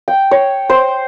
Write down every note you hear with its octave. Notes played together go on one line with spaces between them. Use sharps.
G5
C#5
C5